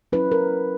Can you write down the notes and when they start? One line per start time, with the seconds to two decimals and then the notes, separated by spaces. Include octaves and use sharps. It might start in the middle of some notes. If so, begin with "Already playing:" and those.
0.12 F#3 C#4 E4 B4
0.32 A#4